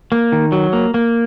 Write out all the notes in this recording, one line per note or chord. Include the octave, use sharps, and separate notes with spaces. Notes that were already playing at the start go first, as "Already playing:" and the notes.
A#3
D#3
F#3
A#3
A#3